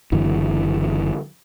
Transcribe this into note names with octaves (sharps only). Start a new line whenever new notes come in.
F#1 F#2 D3 E3